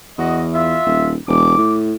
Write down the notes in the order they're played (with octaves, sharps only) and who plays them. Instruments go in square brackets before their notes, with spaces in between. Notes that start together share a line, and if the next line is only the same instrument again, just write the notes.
[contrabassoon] E2 [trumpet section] F#4 D#5
[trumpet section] F4 E5
[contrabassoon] D#1
[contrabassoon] E1 [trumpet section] D6
[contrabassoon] A2